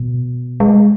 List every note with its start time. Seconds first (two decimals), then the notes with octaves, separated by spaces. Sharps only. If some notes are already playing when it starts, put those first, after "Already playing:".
Already playing: B2
0.60 G#3